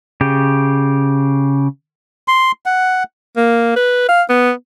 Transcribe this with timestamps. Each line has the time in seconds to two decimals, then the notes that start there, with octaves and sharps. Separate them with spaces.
0.21 C#3 G4
2.28 C6
2.66 F#5
3.37 A#3
3.76 B4
4.09 F5
4.29 B3